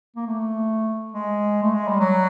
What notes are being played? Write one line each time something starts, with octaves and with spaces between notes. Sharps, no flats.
A#3
A3
G#3
A3
G#3
G3
F#3